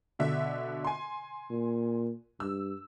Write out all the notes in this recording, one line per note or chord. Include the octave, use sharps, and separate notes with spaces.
B2 D3 E5
G#5 C6
A#2
G2 E6